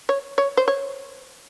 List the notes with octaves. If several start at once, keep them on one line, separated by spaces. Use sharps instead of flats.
C#5
C#5
C5
C#5